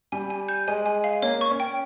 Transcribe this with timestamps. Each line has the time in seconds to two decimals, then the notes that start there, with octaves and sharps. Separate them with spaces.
0.12 G3 G#5
0.30 G#5
0.48 G6
0.68 G#3 G#5
0.86 G#5
1.04 F5
1.22 A#3 C#5
1.41 C#6
1.51 C#4
1.60 G5